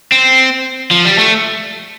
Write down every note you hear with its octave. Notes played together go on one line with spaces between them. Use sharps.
C4
F3
G3
A3